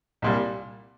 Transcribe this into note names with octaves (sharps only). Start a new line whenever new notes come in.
C2 A#2 G3